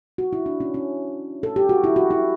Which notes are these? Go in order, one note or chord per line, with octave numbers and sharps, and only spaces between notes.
F#4
E4
D4
C#4
C#4
A4
G4
F#4
E4
F#4
E4